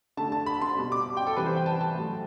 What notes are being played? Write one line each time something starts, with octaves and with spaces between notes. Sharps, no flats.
D3 A3 A5
A5
B5
C6
B2 G3
D6
G5
A4
C3 E3 G3 B4
C5
G5
A5
A5
A2 F#3 A3